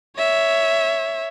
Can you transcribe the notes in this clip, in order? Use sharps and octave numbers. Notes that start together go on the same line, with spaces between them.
C#5 E5